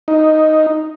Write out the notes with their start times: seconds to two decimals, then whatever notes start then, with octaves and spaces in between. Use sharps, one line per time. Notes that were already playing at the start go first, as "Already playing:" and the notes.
0.08 D#4